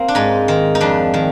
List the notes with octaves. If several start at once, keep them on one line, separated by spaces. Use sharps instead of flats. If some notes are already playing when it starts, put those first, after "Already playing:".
Already playing: A#3 C4
D4
G#2 D#4
D#3
D#4
F2 D4
D#3